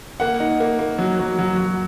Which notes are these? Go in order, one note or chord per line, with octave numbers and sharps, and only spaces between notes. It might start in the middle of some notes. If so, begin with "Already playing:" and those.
A#3 F#5
D#4
A#3
A#3
F#3
F#3
F#3
F#3